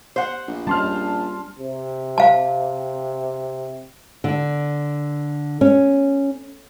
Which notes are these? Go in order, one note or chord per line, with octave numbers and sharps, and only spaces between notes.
C5 F#5
A#1
G3 C#4 A5 C6 F6
C3
F5 A5
D3
C#4